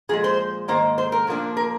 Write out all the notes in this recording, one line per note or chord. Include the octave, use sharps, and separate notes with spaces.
A#2 F3 G#3 G#4
C5
G#2 D#3 A#3 C5
C5
A#4
A#2 F3 A#3 D4
A#4